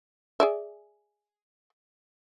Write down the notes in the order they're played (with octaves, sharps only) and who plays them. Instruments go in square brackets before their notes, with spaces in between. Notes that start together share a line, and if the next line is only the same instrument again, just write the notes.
[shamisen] G#4 D5 E5